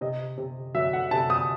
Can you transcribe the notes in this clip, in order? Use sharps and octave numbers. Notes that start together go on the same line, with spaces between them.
C3 D#5
C3
F#3 E5
F#5
C3 A5
D#6